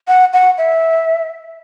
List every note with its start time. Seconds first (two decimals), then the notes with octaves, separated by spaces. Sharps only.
0.08 F#5
0.33 F#5
0.58 E5